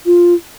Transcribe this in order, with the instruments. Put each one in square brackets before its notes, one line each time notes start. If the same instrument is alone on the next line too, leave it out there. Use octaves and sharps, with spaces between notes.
[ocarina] F4